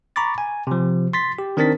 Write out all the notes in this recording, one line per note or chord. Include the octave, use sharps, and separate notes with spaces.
A#5 B5 C#6 D6 A6
G#5
C3 F3
C6 A6 B6
G4
D#3 C4 D4 A#4 A6 B6